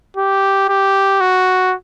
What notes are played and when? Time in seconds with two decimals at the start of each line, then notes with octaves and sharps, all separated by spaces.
0.17 G4
0.69 G4
1.21 F#4